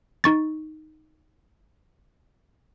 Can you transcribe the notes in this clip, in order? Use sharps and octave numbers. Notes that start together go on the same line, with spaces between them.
D#4 C#6 A6